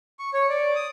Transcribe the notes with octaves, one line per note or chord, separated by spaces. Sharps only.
C#6
C#5
D5
D#6